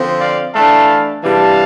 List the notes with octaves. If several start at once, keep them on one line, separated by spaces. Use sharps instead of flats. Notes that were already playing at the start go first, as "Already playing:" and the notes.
Already playing: D3 F3 C4
D5 F5
E3 A3 D4 F5 A5
C3 E3 G3 D4 F5 A5